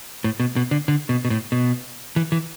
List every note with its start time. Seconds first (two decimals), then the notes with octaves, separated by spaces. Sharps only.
0.24 A2
0.40 B2
0.56 B2
0.71 D3
0.88 D3
1.09 B2
1.25 B2
1.30 A2
1.52 B2
2.16 E3
2.32 E3